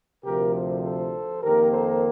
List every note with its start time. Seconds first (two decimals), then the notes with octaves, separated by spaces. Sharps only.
0.24 D2 C3 F3 G4 A#4
0.54 A4 C5
0.83 A4 C5
1.43 F2 D#3 A#3 G4 A#4
1.72 A4 C5